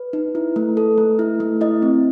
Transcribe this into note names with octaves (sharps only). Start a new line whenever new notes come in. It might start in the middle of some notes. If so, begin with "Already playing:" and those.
Already playing: B4
D#4
E4
A3
A4
A3
E4
A3
E4 D#5
C4